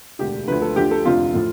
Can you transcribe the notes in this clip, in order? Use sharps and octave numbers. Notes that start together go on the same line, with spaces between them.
E1 D2 D3 G4
D2 D3 F3 B4
A4
D2 D3 F3 G4
A4
F1 F2 D3 F4
A2 F3